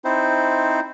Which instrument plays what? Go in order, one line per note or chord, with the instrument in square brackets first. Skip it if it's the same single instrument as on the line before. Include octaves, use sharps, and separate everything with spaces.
[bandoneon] C4 D#4 E4 C5